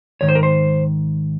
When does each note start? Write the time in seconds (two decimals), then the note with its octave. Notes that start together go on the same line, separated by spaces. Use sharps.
0.21 G#2 D#3 C#5
0.29 C5
0.35 A#4
0.43 C5